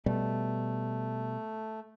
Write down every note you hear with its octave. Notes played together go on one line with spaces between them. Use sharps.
B2 G3 A3